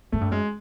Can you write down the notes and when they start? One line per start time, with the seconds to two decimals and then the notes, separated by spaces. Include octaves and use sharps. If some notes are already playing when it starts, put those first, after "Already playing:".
0.12 G#2 A3
0.21 G2
0.31 F#2 G#3